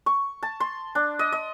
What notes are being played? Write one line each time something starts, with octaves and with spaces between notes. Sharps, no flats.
C#6
A5
C6
D4
D#5
D#5